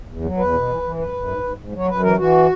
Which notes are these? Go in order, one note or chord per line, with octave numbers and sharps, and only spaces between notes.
E2
F#3
E2 B4
B2
E3
E3
F#2 B4
F#2
G#2
G#2
G#2
F#3 C#5
F#2 B4
E3 A#4
E3 F#4